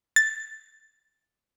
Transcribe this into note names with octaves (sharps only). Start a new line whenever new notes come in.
A6